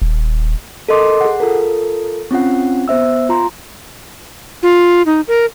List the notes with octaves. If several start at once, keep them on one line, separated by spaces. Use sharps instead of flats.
D#1
A4 A#4 D#5 C6 D6
G#4 F#5
F4 A4 A#4
C4 C#4 F4 F#5
B3 C5 E5 E6
F4 A#5 C6
F4
D#4
A#4